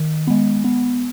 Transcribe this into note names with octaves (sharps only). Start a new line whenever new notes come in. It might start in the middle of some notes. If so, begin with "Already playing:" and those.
Already playing: D#3
G#3 B3
B3